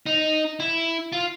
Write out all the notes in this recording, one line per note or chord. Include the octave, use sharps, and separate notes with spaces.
D#4
E4
F4